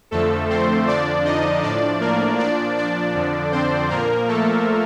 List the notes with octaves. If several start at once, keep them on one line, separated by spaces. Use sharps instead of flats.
F2 D3 F3 A3 A4
C4 C5
F2 D3 F3 D4 D5
D#4 D#5
A2 F3 D4 D5
A#3 A#4
A#2 F3 D4 D5
D4 D5
F2 D3 F3
C4 C5
A#2 F3 A#3 A#4
A3 A4